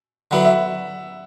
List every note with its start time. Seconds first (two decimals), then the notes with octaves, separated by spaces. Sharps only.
0.31 D3 F#3 B3 E4 F#5
0.45 E5